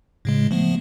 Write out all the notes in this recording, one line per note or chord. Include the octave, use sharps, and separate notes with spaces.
A2 C#3 G#3
F3 A3 B3